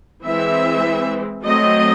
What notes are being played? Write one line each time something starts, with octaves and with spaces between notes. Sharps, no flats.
E3 G#3 C4 E5
F#3 A3 C4 D#5